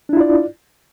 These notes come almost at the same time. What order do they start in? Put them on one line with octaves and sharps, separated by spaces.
D4 E4 F4 D5